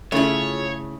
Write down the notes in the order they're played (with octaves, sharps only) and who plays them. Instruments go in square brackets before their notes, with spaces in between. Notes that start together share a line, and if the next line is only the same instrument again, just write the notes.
[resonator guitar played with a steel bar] C#3 [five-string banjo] A3 E4 [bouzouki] F4 G#4 [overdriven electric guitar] C#5